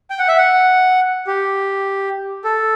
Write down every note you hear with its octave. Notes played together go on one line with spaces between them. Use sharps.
G5
F#5
E5
F#5
G4
A4